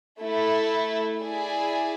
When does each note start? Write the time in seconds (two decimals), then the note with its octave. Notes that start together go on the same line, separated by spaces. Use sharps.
0.20 A3 E4 A4
1.20 E4 G#4 D5 G#5